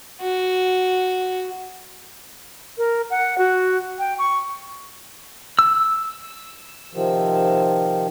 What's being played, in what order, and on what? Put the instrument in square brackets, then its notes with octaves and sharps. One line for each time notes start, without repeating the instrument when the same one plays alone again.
[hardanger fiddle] F#4
[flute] A#4
F#5
F#4
G5
C#6
[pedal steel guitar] E6
[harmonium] C3 D#3 F3